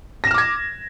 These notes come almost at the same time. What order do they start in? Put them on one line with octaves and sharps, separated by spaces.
A#6 E7 F6 D6 G#6